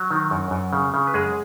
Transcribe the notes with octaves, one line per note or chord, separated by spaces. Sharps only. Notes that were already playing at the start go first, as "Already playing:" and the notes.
Already playing: F#3 F#4
D#3
F#2
F#2
C#3
C#3
B4
F#2 G#3 G#4